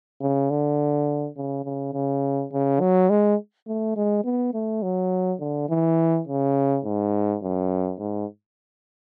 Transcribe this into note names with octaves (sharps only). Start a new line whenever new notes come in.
C#3
D3
C#3
C#3
C#3
C#3
F#3
G#3
A3
G#3
B3
A3
F#3
D3
E3
C#3
G#2
F#2
G#2